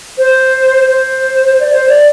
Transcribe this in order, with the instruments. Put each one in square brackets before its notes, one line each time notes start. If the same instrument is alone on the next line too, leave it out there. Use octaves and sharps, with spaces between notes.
[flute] C5
C5
D5
C5
D5